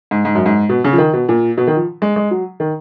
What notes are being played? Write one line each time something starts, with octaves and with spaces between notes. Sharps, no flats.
G#2
G#2
F#2
G#2
B2
C#3
F3
D#3
B2
A#2
B2
D#3
F3
G#3
G#3
F#3
D#3